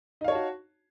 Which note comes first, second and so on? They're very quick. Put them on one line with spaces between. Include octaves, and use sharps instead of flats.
D#4 F5 C#5 A5 F#4